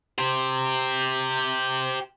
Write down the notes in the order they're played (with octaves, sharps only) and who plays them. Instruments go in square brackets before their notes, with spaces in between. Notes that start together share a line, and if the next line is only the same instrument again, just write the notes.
[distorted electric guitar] G4 C5